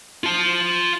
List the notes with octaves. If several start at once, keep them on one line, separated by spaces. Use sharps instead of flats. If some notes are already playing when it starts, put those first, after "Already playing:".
F4 A5